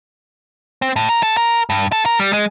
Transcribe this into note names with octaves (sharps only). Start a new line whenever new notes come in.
C4
A2
A#4
A4
A#4
G2
A4
A#4
G3
G#3